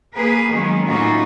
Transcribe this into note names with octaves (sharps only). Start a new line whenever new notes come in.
A#3 G#4 A#4 B4
D#3 F#3 G#3 B3 C#4
A2 A#3 C#4 D#4 F4 F#4